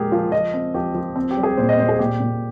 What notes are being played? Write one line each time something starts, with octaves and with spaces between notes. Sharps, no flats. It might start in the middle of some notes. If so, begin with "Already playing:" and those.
Already playing: A#2 F3 G#3 G4 G#4 A#4
F3 F4
F3 D#5
C4
F3 G4
F3
C4
G4
G3
G#4
A#2 C5
D#5
A#2 C5
G#4
A#2 G4
A#2